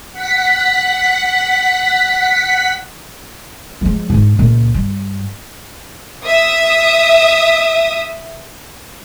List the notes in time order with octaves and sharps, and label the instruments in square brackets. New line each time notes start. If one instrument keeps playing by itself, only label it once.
[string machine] F#5 B6
[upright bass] F3 G#3
G#2 D4
C#2 A#2
G2
[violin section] E5 D#6